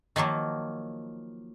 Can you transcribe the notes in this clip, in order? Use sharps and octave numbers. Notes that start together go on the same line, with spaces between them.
D#3 F3 F#3 A#3